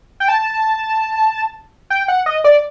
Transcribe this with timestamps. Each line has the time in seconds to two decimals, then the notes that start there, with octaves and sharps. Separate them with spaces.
0.20 G5
0.28 A5
1.90 G5
2.08 F#5
2.26 D#5
2.44 D5